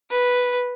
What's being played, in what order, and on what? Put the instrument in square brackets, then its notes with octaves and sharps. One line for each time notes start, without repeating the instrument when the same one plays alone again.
[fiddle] B4